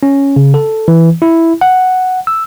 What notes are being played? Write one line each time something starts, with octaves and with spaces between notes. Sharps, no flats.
C#4
C#3
A4
E3
E4
F#5
E6